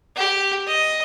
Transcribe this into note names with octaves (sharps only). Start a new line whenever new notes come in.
G4
D#5